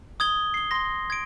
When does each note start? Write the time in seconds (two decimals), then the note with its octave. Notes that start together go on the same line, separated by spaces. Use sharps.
0.20 D#6 G#6 G7
0.54 C7 G7
0.71 C6 A#6
1.10 G#6 D7